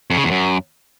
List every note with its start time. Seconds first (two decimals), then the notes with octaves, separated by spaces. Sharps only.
0.10 F2
0.17 C#3
0.24 E2
0.31 F#2